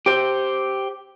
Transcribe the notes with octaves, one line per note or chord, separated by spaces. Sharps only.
G4 C5